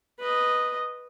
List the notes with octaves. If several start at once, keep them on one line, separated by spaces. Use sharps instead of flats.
B4 D#5